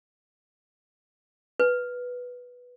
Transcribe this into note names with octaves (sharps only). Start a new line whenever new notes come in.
B4